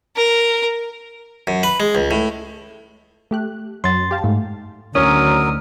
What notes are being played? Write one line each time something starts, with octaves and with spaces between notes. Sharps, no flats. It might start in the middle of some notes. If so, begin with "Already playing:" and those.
A#4
F#2
B4
G#3
C#2
A2
A3 G4 F#6
F#2 F#3 C6 A6
G4 F5 A5
G#2 A3
D2 D#3 F#3 C#4 A#4 D#6